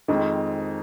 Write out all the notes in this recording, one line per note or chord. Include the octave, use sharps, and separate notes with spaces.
F2 D#3 G#3 C4